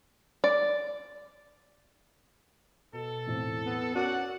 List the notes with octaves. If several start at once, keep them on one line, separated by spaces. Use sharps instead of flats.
D5
B2 A4
E2 A2 C4
B3
C#4 F#4 A#4 D5 F#5 A5